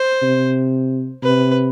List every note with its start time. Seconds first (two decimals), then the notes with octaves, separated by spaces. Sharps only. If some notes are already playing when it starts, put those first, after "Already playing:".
Already playing: C5
0.22 C3
1.23 C3 B4